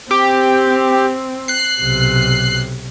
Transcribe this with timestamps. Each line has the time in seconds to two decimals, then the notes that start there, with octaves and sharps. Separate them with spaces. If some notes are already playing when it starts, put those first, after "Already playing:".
0.11 C4 G4
1.48 F#6 C7
1.81 B1 C3